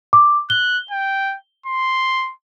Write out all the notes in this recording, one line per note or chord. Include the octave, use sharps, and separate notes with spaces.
D6
F#6 G7
G5
C6